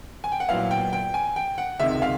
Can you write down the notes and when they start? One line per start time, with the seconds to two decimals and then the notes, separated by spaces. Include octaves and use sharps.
0.24 G#5
0.32 G5
0.40 F#5
0.49 A#2 F#3 B3 E4 F5
0.71 G5
0.93 G5
1.14 G#5
1.36 G5
1.58 F#5
1.80 C#2 C3 D#3 G#3 E5
2.02 F5